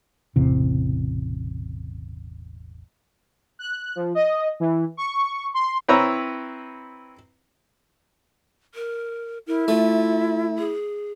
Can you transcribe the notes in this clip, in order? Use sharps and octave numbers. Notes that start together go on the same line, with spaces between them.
E1 A1 E2 C3
F#6
F3
D#5
E3
C#6
C6
C4 E4 B4 C#5 A#5
A#4
E4 A#4
A3 F4
G#4